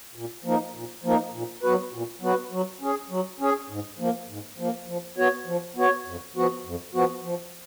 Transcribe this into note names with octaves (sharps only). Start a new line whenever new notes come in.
A#2
F3 A#3 D#4
A#2
F3 A#3 D#4
A#2
F#3 B3 F#4 B4
A#2
F#3 B3 F#4 B4
F#3
C#4 G#4
F#3
C#4 G#4
G#2
F3 A#3
G#2
F3 A#3
F3
B3 F#4 C#5
F3
B3 F#4 C#5
F2
F3 B3 F#4
F2
F3 B3 F#4
F3